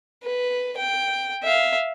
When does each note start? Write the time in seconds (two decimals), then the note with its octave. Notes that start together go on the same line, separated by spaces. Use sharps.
0.23 B4
0.77 G5
1.44 E5 F5